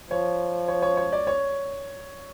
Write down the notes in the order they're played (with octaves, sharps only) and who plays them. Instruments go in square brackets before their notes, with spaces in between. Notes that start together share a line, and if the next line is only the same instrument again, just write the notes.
[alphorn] F3 [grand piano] C#5
[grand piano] C#5
C#5
C#5
D5
C#5